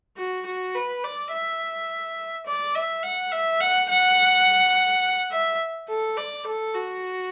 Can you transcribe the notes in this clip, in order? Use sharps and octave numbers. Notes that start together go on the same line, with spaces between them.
F#4
F#4
B4
D5
E5
D5
E5
F#5
E5
F#5
F#5
E5
A4
D5
A4
F#4